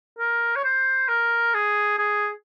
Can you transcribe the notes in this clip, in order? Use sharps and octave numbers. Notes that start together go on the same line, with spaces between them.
A#4
C#5
C5
A#4
G#4
G#4